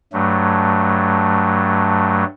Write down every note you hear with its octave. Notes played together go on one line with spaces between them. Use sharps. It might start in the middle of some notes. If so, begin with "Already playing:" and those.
G2 F#3 A3